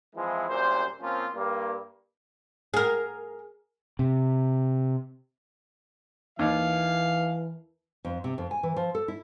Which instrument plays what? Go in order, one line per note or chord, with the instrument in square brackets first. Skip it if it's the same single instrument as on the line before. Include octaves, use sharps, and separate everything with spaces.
[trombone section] E3 F3 G#3 C4 E4
C2 F#2 A#2 C5
F3 A#3 C4 C#4 F4
G2 A#3
[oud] G#4 A#4
[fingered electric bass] C3
[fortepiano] D#2 [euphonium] E3 [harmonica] F5
[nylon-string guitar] F2
C3
F2
G#5
E3
F3
A4
E4